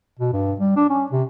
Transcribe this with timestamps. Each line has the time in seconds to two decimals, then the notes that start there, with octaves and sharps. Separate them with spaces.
0.19 B2
0.33 G2
0.60 G3
0.76 D4
0.89 C#4
1.12 C3